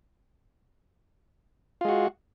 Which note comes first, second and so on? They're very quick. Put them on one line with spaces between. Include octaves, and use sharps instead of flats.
F4 G#3 F#4